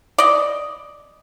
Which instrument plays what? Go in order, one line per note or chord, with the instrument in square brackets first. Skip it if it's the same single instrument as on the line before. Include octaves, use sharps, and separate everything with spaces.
[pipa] D5 D#5